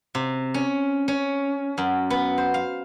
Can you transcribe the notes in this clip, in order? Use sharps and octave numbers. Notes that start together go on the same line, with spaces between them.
C3
C#4
C#4
F#2
B3
C5
F5